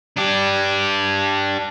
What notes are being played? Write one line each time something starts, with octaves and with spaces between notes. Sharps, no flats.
D4 G4